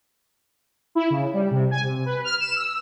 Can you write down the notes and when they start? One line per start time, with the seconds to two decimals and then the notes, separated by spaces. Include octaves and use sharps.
0.95 E4
1.10 C#3
1.33 G3
1.51 C3
1.71 G#5
1.83 C3
2.06 B4
2.24 F6
2.40 E7
2.56 E6